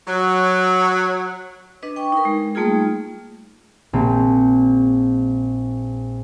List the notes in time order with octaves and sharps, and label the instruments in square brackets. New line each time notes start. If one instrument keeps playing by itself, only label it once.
[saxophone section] F#3
[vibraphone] D4 B4 D#5
G5 C#6 D6
D#4 A#4
G#3
G3 A3 A#3 D#4 F4 G#4
[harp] A#1 A#3 C4